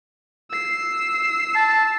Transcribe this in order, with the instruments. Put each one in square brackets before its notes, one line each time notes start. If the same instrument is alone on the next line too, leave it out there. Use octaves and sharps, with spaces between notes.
[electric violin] E6 C7
[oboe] A5